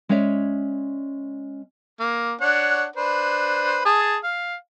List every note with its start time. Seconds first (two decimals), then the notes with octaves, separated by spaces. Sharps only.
0.09 G#3 C#4 C#5 D5 E5
2.00 A#3
2.41 D4 C#5 F#5
2.96 D4 B4 C5
3.85 G#4 A5
4.24 F5